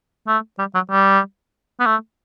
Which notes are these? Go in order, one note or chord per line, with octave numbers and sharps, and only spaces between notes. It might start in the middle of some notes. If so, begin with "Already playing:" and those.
A3
G3
F#3
G3
B3
A3